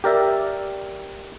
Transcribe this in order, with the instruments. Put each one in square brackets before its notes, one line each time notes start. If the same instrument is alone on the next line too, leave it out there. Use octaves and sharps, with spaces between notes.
[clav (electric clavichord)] G4 A#4 D5 E5